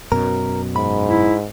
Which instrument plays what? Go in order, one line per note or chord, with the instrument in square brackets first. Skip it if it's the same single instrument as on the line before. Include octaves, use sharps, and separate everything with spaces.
[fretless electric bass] F#2 B2 F#3 [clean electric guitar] A#4
[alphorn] G#2 [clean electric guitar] B5
[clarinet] E4